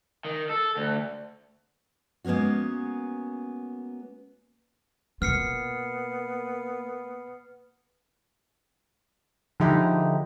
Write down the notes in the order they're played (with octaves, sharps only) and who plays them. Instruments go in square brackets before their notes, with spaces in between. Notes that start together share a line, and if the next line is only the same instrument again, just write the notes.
[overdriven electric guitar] D#3
A4
D2
[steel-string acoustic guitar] G#3 A#3 B3 C#4 F#4
[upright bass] B2 F4 [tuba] A#3 [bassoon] B3 [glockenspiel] F6 C7 C#7
[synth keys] D3 F3 G#3 D#4 E4 G4